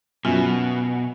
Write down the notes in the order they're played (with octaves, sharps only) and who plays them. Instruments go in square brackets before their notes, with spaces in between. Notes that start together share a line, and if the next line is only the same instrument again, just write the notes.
[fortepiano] F#2 [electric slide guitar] B2 [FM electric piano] B3 E5 G#5 [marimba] F4